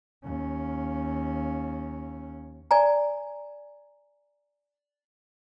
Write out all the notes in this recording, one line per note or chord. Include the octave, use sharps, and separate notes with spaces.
D#2 C#4
D5 G#5 A#5